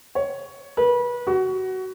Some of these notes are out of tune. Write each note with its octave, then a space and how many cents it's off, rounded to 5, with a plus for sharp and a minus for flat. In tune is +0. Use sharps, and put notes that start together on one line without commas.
C#5 +10
B4 -30
F#4 +20